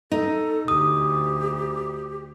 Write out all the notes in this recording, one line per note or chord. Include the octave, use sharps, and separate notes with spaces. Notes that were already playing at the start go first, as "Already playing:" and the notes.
D#4 A4
D2 G4 D#6